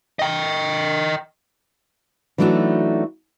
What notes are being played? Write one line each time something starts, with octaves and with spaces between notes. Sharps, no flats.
D#5 G5
E3 F#3 A3 D4 D#4 F#4